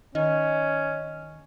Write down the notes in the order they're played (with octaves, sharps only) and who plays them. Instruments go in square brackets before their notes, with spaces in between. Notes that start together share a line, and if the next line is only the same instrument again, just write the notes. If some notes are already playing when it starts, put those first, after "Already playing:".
[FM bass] D#3 [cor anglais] C#4 [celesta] D#5